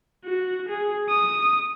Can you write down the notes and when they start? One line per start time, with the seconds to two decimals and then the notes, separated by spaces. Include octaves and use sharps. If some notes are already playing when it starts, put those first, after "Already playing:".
0.25 F#4
0.69 G#4
1.09 D#6